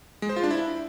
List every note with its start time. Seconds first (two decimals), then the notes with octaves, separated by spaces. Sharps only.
0.22 G#3
0.29 C5
0.36 F4
0.43 D4
0.51 E4